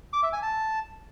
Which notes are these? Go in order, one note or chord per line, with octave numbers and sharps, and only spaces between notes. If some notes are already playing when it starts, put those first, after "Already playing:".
D6
E5
G#5
A5